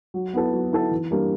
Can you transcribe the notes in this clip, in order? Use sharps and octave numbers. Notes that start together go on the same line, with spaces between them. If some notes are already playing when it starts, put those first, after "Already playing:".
F#3
B3 E4 A4
F#3
B3 E4 A4
E3
G3 A#3 D4